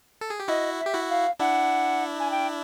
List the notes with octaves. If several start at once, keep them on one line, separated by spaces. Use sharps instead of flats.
A4
G#4
G4
E4 F#4 D#5
E5
G4
E4 F#4
F5
D4 E4 F#5
G#5
G5